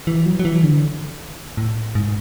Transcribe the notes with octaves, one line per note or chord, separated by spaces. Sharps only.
E3
F#3
F#3
E3
D3
A2
G#2